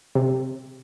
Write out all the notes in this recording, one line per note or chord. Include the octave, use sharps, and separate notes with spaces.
C3